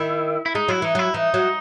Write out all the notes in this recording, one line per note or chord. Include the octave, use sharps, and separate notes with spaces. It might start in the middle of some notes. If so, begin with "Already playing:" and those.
Already playing: D#3 E4
E4
G#3 D#4
F#3 E4
E3 D#4
F#3 E4
E3 D#4
F#3